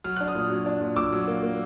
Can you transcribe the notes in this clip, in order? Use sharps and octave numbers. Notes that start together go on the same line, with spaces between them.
F#3 F6
D4 F#6
D#6 F6
A#2
F#3
D4
A#2
A#2 D6 E6
F#3
A#3
A#3